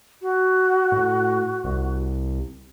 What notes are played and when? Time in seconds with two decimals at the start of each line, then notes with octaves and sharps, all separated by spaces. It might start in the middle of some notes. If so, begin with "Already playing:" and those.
0.22 F#4
0.92 A2
1.64 C2